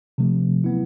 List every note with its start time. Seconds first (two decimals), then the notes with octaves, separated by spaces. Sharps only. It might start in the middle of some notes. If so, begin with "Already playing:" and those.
0.18 C3 F3 A3
0.64 F#3 B3 E4